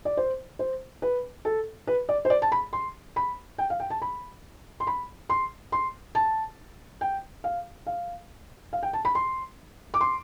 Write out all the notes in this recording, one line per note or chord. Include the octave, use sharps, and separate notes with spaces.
D5
C5
C5
B4
A4
B4
D5
C5
D5
A5
B5
C6
B5
G5
F5
G5
A5
B5
C6
B5
C6
C6
A5
G5
F5
F5
F5
G5
A5
B5
C6
D6
C6